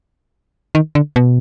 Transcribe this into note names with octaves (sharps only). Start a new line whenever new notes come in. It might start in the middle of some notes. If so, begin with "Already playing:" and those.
D#3
D3
B2